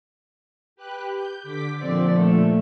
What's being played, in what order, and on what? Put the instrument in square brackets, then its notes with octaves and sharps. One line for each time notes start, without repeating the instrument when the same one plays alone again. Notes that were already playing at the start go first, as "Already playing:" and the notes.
[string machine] G4 B4 F#6
G6
D3 D6 B6
[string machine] A#2 D3 F3 [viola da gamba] C4 D5
[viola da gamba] A3